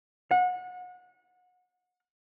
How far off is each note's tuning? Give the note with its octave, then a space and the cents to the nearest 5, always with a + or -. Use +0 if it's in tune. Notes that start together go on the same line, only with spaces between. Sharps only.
F#5 -30